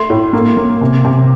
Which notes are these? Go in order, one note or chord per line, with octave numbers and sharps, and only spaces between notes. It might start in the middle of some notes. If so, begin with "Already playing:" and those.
Already playing: A3 C6
A2
A#3
A#3
C3
C3